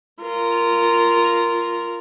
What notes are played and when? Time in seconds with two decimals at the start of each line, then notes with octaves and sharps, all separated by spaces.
0.23 F4 A#4